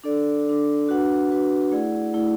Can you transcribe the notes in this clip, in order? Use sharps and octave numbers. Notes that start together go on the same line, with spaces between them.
D4 A4 D5
D4 A4 D5
D4 F#4 B4 F#5
D4 F#4 B4 F#5
A3 E4 G#4 D5 F#5
A3 E4 G#4 D5 F#5